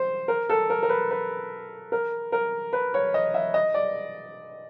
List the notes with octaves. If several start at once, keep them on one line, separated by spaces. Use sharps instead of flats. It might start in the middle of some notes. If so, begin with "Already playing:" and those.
Already playing: C5
A#4
A4
A#4
A#4
B4
B4
A#4
A#4
B4
C#5
D#5
E5
D#5
D5